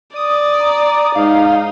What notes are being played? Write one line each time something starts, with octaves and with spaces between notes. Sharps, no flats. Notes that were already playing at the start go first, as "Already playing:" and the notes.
D5 D#6
A#5
G#2 D#4 F5